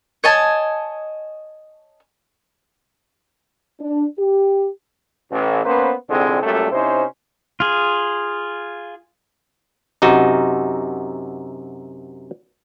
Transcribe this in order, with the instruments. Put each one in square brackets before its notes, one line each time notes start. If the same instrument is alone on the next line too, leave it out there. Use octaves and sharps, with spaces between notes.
[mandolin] C#5 D#5 G#5 A5
[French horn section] D4
G4
[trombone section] A1
A#3 B3 C#4 B4 C5
C2 F2 G#2 D3 G#3 C4
F#2 A#2 G3 A3 A4
C3 C#4 D#4 E4 C5
[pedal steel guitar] F4 G#4
[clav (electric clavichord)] F#2 C3 D#4 F#4